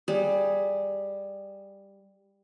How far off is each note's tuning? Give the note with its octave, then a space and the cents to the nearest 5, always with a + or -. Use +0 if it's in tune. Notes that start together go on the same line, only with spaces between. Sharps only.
G3 +10 G#4 +5